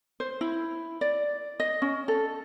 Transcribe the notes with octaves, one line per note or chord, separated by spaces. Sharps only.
C5
E4
D5
D#5
C#4
A4